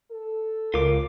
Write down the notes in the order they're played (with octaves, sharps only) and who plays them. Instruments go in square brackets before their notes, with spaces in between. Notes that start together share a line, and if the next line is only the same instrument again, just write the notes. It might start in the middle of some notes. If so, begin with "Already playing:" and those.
[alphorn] A4
[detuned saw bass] C#2 [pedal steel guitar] F4 D6 [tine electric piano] A#4